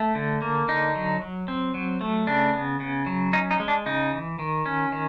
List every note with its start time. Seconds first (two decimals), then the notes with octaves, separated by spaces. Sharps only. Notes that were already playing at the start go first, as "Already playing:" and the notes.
Already playing: A3
0.15 D3
0.42 A#3
0.68 D3 D#4
0.95 F#3
1.22 F#3
1.48 C4
1.74 F#3
2.01 A3
2.27 C#3 D4
2.53 B3
2.80 C#3
3.06 F#3
3.33 C#4 D#4
3.51 D#4
3.60 G#3
3.68 D4
3.86 C#3 D#4
4.13 E3
4.39 D#3
4.66 C#4
4.92 D#3